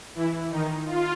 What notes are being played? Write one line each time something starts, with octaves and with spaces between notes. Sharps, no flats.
E3 E4
D#3 D#4
F4